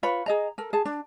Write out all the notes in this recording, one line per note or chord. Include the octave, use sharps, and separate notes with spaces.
F4 B4 C#5 B5
G#4 D#5 A#5
A4 A#4
G#4 A5
D4